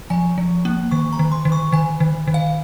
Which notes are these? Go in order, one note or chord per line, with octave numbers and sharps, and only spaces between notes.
F3 G#5
F3
A#3
D#3 C#6
A#5
D#3
C6
D#3
C#6
D#3 G#5
D#3
D#3
F5